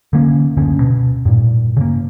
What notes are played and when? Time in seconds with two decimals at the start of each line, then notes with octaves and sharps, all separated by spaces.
0.13 D3 A#3 C#4
0.57 F#1 D2 D3 C#4
0.81 B2
1.25 G2 A#2
1.77 C#3 A#3